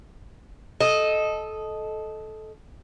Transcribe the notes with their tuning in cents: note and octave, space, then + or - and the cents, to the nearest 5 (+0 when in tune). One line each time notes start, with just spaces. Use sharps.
A4 -15 D#5 +0